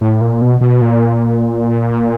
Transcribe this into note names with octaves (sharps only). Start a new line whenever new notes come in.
A2
A#2
B2
B2
A#2